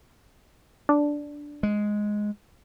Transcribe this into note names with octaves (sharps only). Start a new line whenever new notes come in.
D4
G#3